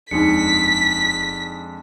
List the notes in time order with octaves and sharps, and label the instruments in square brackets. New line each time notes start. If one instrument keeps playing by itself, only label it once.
[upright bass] D#1 [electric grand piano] F2 G#3 D4 [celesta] D#4 C#7 [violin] B6